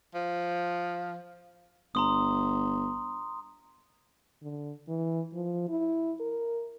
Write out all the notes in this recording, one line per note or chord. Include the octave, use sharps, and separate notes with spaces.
F3
G1 A#5 C6 D#6
D3
E3
F3
E4
A#4